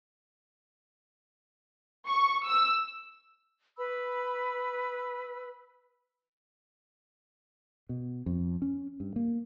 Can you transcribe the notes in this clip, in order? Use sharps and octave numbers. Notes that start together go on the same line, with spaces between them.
C#6
E6
B4 B5 E6
B2
F2
C#4
G2
A#3